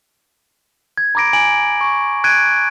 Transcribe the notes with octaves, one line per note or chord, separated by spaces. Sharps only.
G#6
A#5 B5 D6 A#6 D7
G#5 D7 F#7
C#6
F#6 G#6 D7 D#7